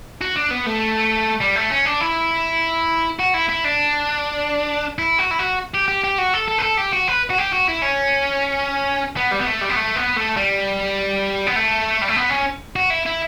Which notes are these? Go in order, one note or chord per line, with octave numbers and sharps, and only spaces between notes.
F#4
D4
B3
A3
G3
A3
C#4
D4
E4
F#4
E4
E4
D4
E4
F#4
E4
F#4
G4
G4
G4
F#4
A4
A4
B4
A4
G4
F#4
B4
F#4
G4
F#4
E4
C#4
B3
G3
B3
A3
G3
B3
A3
B3
A3
G3
B3
A3
G3
A3
B3
C#4
F#4
E4
E4